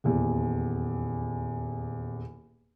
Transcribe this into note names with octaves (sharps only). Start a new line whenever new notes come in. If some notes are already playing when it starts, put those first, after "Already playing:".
D#1 E2